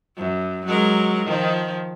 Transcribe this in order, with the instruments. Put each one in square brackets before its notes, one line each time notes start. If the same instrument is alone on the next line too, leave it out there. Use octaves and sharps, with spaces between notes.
[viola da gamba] F#2
F#3 G#3 A#4
D#3 F3